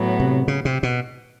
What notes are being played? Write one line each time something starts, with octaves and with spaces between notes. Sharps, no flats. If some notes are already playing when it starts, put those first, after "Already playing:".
Already playing: A2 F#3 B3
C3
C#3
C3
B2